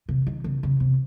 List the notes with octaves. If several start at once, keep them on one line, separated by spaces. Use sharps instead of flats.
C3
D#3
C#3
C#3
C3